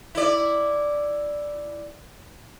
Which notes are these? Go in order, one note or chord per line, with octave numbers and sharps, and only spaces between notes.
E4 D5